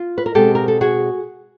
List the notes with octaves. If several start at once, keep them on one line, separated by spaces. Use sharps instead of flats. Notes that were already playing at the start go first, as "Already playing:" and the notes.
Already playing: F4
B4
A#4
B2 G#3 C4 G4 A4
A#4
A4
F#4 G#4